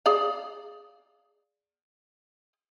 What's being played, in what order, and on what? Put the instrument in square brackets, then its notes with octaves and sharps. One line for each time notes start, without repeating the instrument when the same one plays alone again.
[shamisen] G#4 D5 F5